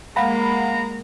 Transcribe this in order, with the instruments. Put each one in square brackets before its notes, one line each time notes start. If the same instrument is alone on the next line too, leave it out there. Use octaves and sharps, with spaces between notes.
[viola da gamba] G#3 A#3 [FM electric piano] F5 F#5 B5 [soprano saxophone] A#5